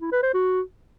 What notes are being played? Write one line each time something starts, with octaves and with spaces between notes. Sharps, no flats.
E4
B4
C5
F#4